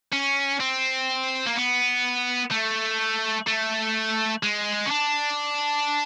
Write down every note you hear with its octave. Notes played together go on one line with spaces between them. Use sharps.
C#4
C4
A#3
B3
A3
A3
G#3
C#4
D4